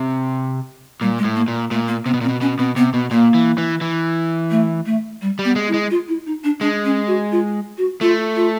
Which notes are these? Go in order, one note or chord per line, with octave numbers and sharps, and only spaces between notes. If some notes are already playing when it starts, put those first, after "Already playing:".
Already playing: C3
A#2 G3
G#3
A2
A#3
A#2
A#2 A3
A#3
C3 B3
B2
A#2 C4
B2
B2 C#4
B2 C4
C3 B3
B2 B3
A#2 A#3
E3
E3
E3
A3
A3
G3
G3
B3
G#3
E4
G#3
F4
E4
D#4
D4
G#3 D4
C#4
F#4
F4
F#4
A3 F4
F4